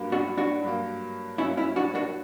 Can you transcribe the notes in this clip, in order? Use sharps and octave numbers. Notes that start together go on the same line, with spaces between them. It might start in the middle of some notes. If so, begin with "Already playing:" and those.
Already playing: G2 F#3 A#3
D4 F#4
D4 F#4
G2 F#3 A#3
G2 F#3 A#3 C#4 E4
C#4 E4
D4 F#4
D4 F#4